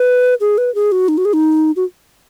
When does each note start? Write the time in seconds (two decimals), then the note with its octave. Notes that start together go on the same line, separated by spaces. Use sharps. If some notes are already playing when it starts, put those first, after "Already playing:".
Already playing: B4
0.41 G#4
0.58 B4
0.75 G#4
0.92 F#4
1.08 D#4
1.18 F#4
1.25 G#4
1.33 D#4
1.76 F#4